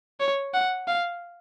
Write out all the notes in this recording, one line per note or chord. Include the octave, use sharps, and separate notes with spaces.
C#5
F#5
F5